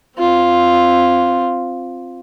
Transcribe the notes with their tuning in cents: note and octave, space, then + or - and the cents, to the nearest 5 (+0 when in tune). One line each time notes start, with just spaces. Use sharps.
C4 +0 F4 +0